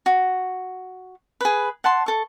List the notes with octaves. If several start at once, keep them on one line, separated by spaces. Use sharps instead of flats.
F#4
G#4 B4
F#5 A5 C6
A4 C#6